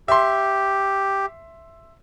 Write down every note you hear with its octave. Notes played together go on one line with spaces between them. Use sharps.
G4 E5 C6